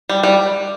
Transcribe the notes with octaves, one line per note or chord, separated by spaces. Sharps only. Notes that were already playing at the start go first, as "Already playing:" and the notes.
G3
G3